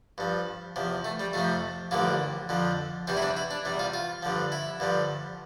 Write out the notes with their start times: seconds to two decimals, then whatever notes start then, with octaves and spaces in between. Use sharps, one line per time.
0.18 G2 F3
0.76 E2 C3 F3
1.05 A3
1.20 G3
1.33 F2 C3 F3 A3
1.91 A1 G2 D3 F3 A#3
2.49 F2 D3 F3
3.07 E2 C3 E3 G3 C4
3.17 E4
3.22 D4
3.37 E4
3.51 D4
3.65 E2 C3 G3
3.79 F4
3.94 F4
4.23 G2 D3 F3
4.52 E4
4.80 G2 D3 F3